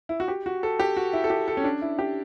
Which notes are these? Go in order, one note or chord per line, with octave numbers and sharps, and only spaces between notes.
E4
F#4
G4
F#4
A4
G4
F#4
E4
A4
G4
A4
C#4
D4
E4
G4